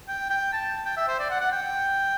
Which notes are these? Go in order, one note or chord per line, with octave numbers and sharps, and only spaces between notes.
G5
G5
A5
G5
E5
C5
D5
F#5
F#5
G5